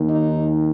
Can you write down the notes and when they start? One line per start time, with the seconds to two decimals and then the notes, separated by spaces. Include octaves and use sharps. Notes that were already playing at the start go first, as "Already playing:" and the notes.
Already playing: D#2 D#3
0.10 D#4